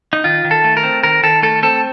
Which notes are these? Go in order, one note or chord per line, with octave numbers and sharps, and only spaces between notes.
D#4
D#3 F4
D#3
A4
A3
A#4
C4
D#3 A#4
D#3 A4
A3 A4
C4 A4